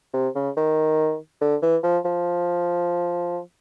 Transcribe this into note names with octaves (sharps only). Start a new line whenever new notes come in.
C3
C#3
D#3
D3
E3
F3
F3